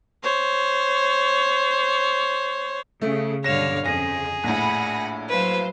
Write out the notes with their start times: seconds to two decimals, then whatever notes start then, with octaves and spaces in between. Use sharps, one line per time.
0.23 C5 C#5
3.02 C#3 A3
3.44 B1 G2 D3 C#5 F5 A#6 E7
3.86 F2 C#3 G#4 A#6
4.44 A#1 A2 F#5 B5 A#6
5.29 F#3 B4 C5 F5